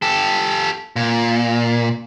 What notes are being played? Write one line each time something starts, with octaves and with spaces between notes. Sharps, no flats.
G4 A4
A#2